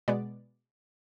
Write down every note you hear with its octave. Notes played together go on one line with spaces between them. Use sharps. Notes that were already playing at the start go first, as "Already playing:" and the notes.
B2 G#3 B3 D5